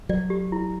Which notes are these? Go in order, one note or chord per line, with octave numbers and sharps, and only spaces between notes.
F#3 D5
G4
E4